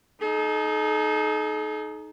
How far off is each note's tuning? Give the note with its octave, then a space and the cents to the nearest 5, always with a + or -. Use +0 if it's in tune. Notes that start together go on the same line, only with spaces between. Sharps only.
D#4 +0 A4 -45